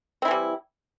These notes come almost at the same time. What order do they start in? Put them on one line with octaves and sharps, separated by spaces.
C4 E4 E3 G3